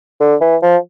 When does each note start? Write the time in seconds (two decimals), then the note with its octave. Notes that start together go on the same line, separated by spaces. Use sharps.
0.20 D3
0.41 E3
0.62 F3